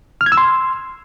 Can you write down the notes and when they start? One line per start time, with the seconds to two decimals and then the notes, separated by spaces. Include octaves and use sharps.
0.21 F6
0.26 G#6
0.32 E6
0.37 C6